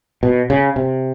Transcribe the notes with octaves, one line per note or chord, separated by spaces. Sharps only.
B2
C#3
C3